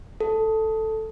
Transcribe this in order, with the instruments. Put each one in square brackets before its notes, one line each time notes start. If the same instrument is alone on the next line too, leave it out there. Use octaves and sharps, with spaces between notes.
[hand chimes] A4